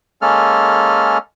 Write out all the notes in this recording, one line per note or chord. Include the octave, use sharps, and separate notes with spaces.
G#3 A#3 C#4 A4 F6